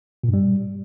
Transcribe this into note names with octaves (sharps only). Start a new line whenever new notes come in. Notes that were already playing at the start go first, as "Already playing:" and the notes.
A#2
G2
G3